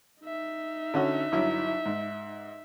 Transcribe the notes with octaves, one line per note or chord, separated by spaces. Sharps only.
D#4 E5
D3 C#4 F#4
G1 F#3 E4
G#2